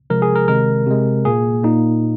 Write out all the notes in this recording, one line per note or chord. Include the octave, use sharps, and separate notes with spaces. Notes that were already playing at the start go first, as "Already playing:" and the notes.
C3 F3 G#3 A#4
G#4
A#4
C3 D#3 G#3 A#4
C3 G#3
A#2 A#3 G#4
A#2 A#3 D#4